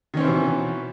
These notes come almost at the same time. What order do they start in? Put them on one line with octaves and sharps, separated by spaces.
D#3 C#4 C4 E3 B2